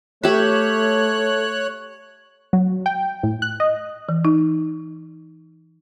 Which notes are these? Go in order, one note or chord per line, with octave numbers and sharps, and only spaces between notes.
A3 G4 C#5 E5 F#6
F#3
G5
A2
F#6
D#5
E3
D#4